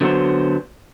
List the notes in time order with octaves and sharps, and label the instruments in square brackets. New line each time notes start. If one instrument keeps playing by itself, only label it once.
[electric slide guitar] D3 F#3 B3 F#4 C5